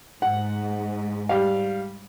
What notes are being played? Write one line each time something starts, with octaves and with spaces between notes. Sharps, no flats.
G#2 F#5
G3 F5